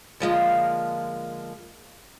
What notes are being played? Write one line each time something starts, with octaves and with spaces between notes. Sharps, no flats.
D3 F3 G#3 A#3